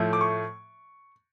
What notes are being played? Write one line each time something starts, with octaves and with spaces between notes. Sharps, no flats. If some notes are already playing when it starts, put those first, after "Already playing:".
Already playing: A2 F3 A3
D6
C#6